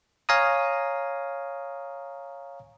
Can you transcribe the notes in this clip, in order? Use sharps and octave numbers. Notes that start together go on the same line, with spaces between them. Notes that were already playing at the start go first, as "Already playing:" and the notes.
C#5 F5 G#5 A#5 D#6